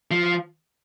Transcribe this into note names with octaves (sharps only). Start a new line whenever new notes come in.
F3